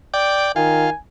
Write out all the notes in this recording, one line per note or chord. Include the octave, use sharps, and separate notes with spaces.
D5 G5
D#3 F4 G#5